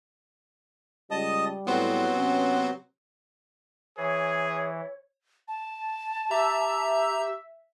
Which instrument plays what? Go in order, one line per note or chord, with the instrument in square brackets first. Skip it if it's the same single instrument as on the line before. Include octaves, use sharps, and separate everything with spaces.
[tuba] C#2 [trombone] G3 [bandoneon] D#5 A5 D#6
[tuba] A2 [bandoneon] F#3 F#4 [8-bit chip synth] B3 C4 C5
[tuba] C3 [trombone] C#4
[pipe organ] E3 [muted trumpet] G#4 [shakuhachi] C#5
[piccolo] A5
[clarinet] G4 [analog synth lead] E5 [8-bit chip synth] A#5